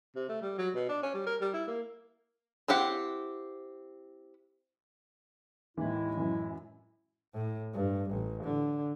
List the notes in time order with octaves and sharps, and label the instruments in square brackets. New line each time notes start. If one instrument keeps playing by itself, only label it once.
[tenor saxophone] C3
A3
G3
F#3
B2
D4
C#4
G3
A#4
G3
E4
A#3
[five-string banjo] C4 E4 G4 F#5
[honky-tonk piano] D#2 E3 [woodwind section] A2 G#3 E4
[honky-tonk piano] F#2 E3
[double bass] A2
G2
A1
D3